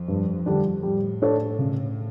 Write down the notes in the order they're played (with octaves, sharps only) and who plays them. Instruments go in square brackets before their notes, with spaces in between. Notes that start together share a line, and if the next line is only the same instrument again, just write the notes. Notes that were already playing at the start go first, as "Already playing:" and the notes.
Already playing: [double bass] F2
[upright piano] G2
D3 G3 D4
[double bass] A2 [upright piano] G3
[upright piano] D4 A4 C#5
C#3